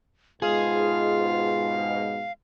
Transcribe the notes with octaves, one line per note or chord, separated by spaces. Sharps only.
G#2 B2 F4 G#4 F5